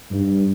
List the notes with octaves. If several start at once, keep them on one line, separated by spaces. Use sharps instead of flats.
G2